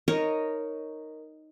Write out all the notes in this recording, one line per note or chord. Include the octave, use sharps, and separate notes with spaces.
D#4 A#4 C#5 D#5